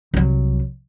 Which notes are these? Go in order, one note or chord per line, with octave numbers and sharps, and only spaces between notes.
C2 F#3